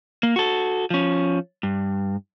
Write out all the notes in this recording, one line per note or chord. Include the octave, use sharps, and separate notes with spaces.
A#3
F#4 A4
F3 C#4
G2